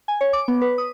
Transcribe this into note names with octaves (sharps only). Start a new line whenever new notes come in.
G#5
C#5
D6
B3
B4
D#6